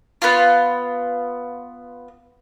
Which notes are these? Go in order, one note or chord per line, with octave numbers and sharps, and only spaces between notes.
B3 F4